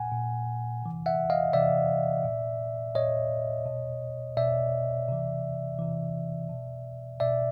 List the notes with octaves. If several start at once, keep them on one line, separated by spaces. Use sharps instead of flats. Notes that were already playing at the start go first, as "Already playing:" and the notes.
Already playing: A#2 F#5 G#5
A#2
C3 E3
E5 F#5
D#5 F5
C3 E3 D5 E5
A#2
A#2 C#5 D#5
B2
B2 D5 E5
C3 E3
C3 E3
B2
B2 D5 E5